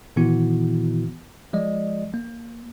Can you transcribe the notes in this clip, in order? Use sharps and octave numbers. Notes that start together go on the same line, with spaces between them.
A#2 D#3 E3 B3 E4 F#4
F3 G#3 D5 D#5
A#3